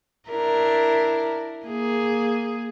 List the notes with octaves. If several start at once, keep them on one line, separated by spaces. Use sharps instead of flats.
D4 E4 A#4
A#3 G#4